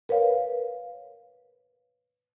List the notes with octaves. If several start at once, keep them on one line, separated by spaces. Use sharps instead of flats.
A#4 B4 C#5 F5